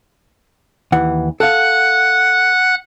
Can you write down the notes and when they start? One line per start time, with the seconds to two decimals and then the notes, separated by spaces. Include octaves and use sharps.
0.92 D#2 E3 F#5
1.40 A4 F5 F#5 F#6